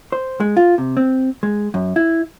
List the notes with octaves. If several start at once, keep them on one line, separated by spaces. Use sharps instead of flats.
C5
G#3
F4
C3
C4
G#3
F#2
E4